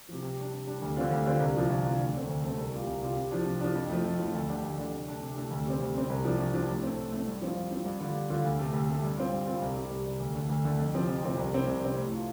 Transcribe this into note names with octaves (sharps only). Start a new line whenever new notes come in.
C3 F3
C3
G3 D4
C3
G3 D4
D2
D3 G3 C4 F4
D2
D3 G3 C4 F4
C2
C3 F3 D4 F4
C2
C3 F3 D4 F4
D2
D3 A3 C4
D2
D3 A3 C4
C2
C3 G3 F4
C2
C3 G3 F4
C3
F3 D4
C3
F3 D4
F2
F3 A3
F2
F3 A3
D2
D3 A3 D4 G4
D2
D3 A3 D4 G4
C3
A3 D4
C3
A3 D4
D2
C3 G3 C4
D2
C3 G3 C4
C2
C3 F3 D4
C2
C3 F3 D4
A2
A3 C4
A2
A3 C4
G2
F3 C4 F4
G2
F3 C4 F4
G2
D3 G3 F4
G2
D3 G3 F4
D2
C3 A3
D2
C3 A3
G2
G3 C4 F4
G2
G3 C4 F4
C2
C3 G3
C2
C3 G3
D2
D3 A3
D2
D3 A3
F2
C3 F3 C4
F2
C3 F3 C4
C2
C3 G3 C4
C2
C3 G3 C4
A2
A3 F4